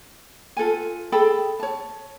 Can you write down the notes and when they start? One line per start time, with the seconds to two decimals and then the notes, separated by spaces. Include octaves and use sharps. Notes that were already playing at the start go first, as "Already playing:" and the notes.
0.57 F4 A4 B4 G#5
1.12 G#4 A4 G5 B5
1.59 C#5 A5